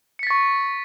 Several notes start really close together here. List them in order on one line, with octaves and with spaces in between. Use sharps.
C#7 B6 A6 C#6